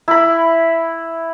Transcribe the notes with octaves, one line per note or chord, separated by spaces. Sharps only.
E4 B5